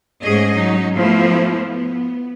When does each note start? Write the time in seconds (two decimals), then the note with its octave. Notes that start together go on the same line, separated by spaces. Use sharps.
0.22 G#2 A3 C#4 G#4 D#5
0.54 F#3 C#4 D#4
0.94 F3 A3 B3 E4 F4
1.67 B3